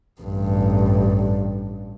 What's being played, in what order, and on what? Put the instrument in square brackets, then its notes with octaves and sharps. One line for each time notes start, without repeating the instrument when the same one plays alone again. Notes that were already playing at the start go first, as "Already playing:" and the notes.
[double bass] A1 G2